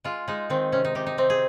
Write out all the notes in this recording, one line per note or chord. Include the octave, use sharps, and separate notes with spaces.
G#3 F4
G#3 D#4
D#3 C4
C3 C#4
D#4
C3 G4
D#4
C3 C4
G#4